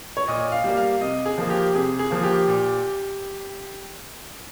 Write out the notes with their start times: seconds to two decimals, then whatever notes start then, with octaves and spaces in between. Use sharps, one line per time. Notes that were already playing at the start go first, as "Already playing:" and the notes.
0.17 C#5
0.28 A#2 D#5
0.52 F5
0.64 G3 A#3
0.77 F5
1.01 C3 D#5
1.26 G#4
1.38 F3 A#3
1.50 G4
1.74 C3 G#4
1.99 G#4
2.11 F3 A#3
2.24 G4
2.48 A#2